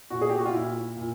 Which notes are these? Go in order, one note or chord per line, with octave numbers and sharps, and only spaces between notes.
A#2 F#4
G#4
G4
F#4
F4
A#2 E4
A#2